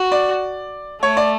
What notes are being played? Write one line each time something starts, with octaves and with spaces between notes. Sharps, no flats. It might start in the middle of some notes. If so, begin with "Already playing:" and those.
Already playing: F#4
D5
A3 C#5
D5